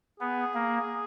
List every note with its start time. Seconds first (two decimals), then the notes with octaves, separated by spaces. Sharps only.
0.20 B3 G#4
0.54 A#3